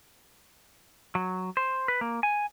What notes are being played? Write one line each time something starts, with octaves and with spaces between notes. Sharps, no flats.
F#3
C5
B4
A#3
G#5